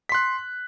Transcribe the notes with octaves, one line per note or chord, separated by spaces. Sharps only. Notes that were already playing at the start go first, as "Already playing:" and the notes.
C6 F#6 B6